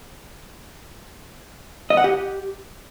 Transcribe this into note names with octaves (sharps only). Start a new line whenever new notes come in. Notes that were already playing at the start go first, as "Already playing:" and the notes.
D#5
F#5
G4